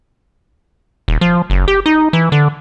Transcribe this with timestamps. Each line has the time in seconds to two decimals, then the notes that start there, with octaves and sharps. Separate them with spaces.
1.08 D#1
1.21 F3
1.50 F#1
1.68 G4
1.86 D#4
2.13 E3
2.32 D3